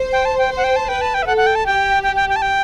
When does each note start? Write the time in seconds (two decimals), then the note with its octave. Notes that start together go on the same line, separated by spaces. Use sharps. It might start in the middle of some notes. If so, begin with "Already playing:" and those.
Already playing: C5
0.13 G5
0.25 A5
0.38 G5
0.51 C5
0.57 F#5
0.64 G5
0.76 A5
0.89 B4 G5
1.01 A5
1.14 G5
1.22 E5
1.27 A4 F#5
1.37 F#5
1.47 G5
1.55 A5
1.66 G4 G5
2.03 G5
2.16 G5
2.29 G5
2.36 A5
2.42 G5